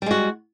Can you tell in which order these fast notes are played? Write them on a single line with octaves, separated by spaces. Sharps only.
G3 G#3 F#4